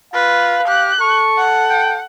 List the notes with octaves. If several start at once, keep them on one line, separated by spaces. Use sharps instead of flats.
F4 B4 F5
G4 F#6
A4 C#6
F#5
G5